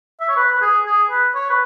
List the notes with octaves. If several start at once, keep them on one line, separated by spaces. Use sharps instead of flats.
E5
C#5
B4
B4
G#4
G#4
B4
C#5
B4